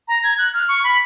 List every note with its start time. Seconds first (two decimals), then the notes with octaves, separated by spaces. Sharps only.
0.08 A#5
0.23 G#6
0.38 F#6
0.54 F6
0.69 C#6
0.84 B5